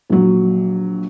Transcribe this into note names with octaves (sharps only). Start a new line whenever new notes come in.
A#1 F#3